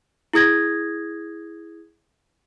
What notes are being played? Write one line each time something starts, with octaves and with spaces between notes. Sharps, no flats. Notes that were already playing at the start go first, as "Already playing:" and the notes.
E4 G#4 D#6 G#6 A#6